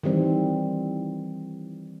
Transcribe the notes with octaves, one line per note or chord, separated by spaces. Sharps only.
D#3 E3 G3 C4